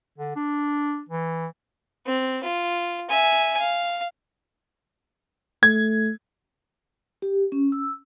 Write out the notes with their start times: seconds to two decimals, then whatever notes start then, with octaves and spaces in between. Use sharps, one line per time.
0.18 D3
0.36 D4
1.09 E3
2.06 C4
2.43 F4
3.10 E5 G#5
3.59 F5
5.63 A3 G#6
7.22 G4
7.52 C#4
7.72 E6